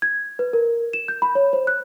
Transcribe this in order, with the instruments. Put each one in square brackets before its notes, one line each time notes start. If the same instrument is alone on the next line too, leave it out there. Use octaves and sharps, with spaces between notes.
[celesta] G#6
B4
A#4
E7
G6
B5
C#5
C5
F#6